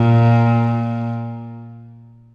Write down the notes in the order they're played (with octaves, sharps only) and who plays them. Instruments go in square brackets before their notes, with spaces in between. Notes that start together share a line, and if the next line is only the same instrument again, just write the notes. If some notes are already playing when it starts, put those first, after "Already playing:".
Already playing: [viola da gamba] A#2